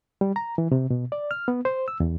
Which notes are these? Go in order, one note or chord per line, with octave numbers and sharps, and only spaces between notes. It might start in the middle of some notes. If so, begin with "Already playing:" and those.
G3
A#5
E3
C3
B2
D5
F6
B3
C5
E6
E2